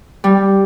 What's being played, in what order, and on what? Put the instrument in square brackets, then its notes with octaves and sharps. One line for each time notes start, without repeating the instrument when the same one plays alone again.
[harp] G3